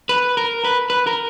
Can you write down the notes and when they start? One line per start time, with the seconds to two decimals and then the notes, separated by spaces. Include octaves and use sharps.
0.09 B4
0.37 A#4
0.65 B4
0.90 B4
1.07 A#4